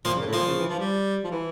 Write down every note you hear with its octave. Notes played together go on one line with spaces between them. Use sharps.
A#2 F3 F4
C#3
A#2
A2
A#2 F3 F4
C#3
E3
F3
G3
F3
E3